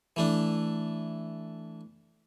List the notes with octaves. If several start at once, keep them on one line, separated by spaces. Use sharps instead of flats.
E3 A3 D4